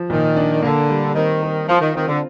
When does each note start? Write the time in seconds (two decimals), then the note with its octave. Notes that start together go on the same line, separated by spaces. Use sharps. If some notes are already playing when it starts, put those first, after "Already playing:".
Already playing: F3
0.10 A#2 D#3
0.37 D4
0.62 D3 A#3
0.90 G3
1.15 D#3 C4
1.42 A#4
1.68 F3 F4
1.81 D#3
1.95 D#3 C4
2.07 D3